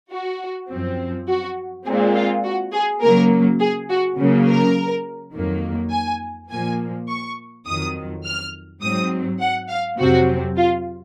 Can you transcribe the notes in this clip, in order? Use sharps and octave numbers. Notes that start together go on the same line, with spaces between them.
F#4
F#2 F3 C4
F#4
A#2 G#3 C4 G#4
F4
F#4
G#4
C#3 F#3 A#3 A#4
G#4
F#4
C#3 F#3 A#3
A#4
F2 D#3 F#3 A#3
G#5
A#2 F3 A#3 G#5
C#6
F2 D#3 F#3 D#6
F6
G#2 F#3 C4 D#6
F#5
F5
F2 C3 F#3 C4 F#4
F4